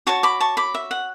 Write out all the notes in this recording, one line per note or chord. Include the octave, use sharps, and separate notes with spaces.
F#4 C#5 A5 C#6
B5 D6
A5 C#6
B5 D6
E5
F#5